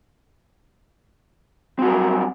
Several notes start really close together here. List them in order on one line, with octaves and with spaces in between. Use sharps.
C4 F#4 G3 A#4 F#3